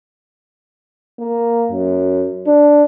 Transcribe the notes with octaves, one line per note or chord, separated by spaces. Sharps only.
A#3
F#2
D4